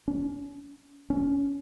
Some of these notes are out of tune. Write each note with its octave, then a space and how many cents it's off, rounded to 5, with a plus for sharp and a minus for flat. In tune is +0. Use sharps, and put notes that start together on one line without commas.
C#4 +40
C#4 +20